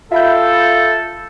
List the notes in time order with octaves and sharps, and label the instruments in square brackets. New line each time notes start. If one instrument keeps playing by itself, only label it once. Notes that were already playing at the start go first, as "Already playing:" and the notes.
[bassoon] F4 [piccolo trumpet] A4 [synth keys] E5 B5 G6